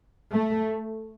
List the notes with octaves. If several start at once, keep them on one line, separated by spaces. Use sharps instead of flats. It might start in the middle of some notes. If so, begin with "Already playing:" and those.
A3